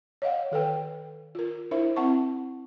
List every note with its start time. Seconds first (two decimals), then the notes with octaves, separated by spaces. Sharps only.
0.22 C#5 D#5 F5 F#5
0.52 D#3 A4 B4 G5
1.35 F4 A#4
1.71 D4 E4 A#4 C5 E5
1.96 C4 E4 F#5 A5 C#6